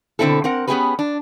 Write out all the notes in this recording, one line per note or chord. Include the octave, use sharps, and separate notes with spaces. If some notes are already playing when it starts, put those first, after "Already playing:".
B2 D3 A3 C4 E4 A4
C4 A#4 F#5
B3 C#4 D#4 G4 G#4 B4
D4